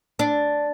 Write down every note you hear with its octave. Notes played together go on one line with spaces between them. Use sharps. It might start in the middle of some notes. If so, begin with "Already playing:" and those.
D4